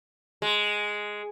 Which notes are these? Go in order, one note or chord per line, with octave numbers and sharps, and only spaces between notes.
G#3